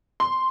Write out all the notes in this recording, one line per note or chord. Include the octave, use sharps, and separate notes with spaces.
C6